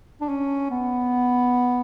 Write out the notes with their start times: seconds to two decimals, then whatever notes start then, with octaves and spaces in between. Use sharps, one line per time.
0.21 D4
0.29 C#4
0.71 B3